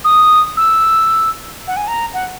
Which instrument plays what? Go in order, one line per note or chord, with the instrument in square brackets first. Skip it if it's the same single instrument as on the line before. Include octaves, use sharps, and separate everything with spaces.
[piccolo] D#6
E6
F#5
G#5
A#5
F#5